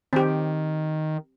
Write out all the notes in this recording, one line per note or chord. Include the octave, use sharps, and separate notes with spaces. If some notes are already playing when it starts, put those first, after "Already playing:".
D#3 C4 G4